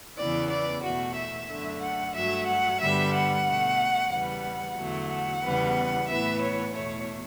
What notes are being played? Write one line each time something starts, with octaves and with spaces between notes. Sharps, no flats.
E2 C#3 E3 B3 D5
D5
E2 B2 A3 F#4
E5
F#2 D3 A3
F#5
G2 F#3 A3 E5
F#5
G2 D3 G3 B3 E5
F#5
B2 A3
E2 C#3 G3 B3 F#5
E2 D3 F#3 A3
F#5
E2 C#3 G3 B3
A2 E3 B3 E5
C#5
E2 B2 A3 C#5